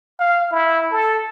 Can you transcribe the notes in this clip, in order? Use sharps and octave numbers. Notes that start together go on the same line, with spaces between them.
F5
E4
A4